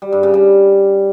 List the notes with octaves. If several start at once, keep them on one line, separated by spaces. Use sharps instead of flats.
G3
G2
C#3
G3